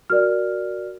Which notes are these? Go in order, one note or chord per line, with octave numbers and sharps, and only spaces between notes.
F#4 A#4 D5 F6